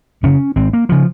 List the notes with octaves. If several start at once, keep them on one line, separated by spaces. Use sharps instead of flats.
F#2 C#3 C#4
G#1 C4
A#3
C#3 F3